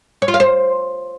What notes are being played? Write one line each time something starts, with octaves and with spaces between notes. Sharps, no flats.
C#5
F4
F5
C5